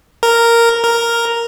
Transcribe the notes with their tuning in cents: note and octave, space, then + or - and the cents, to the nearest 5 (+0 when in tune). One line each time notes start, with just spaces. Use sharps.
A#4 -5
A#4 +0